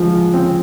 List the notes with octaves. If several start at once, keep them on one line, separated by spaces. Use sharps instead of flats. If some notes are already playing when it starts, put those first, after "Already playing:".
Already playing: F3 G#3
C4